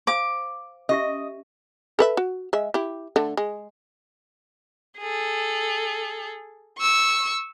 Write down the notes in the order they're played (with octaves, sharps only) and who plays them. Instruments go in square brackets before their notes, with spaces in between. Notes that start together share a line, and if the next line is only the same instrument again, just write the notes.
[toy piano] C5 F5 [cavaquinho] D6
[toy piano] C#4 G4 E5 [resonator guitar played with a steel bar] D#5
[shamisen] A4 B4 E5
F#4
G#3 E5
E4 G4
D3 A3
G#3
[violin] G#4 A4
C#6 E6